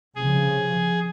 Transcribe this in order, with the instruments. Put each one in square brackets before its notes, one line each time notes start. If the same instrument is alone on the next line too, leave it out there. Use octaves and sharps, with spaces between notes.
[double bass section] C2 C#3 F3 [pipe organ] G#4